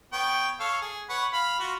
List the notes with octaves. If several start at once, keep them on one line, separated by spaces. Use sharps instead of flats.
B3 C#5 G5
A4 C#5 F5
G#4
B4 C#5 F#5
F5 B5
F4 F#4